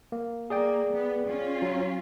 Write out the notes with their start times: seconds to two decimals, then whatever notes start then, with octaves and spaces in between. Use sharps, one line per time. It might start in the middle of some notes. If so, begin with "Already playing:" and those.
0.12 A#3
0.50 A#3 G#4 D5 G5
0.93 B3
1.27 C#4 F4
1.62 F#3